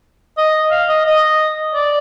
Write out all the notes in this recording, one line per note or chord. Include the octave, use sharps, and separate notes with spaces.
D#5
F5
D#5
D#5
D5